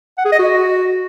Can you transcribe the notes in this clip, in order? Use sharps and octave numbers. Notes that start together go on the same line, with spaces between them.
F#5
G#4
D#5
F#4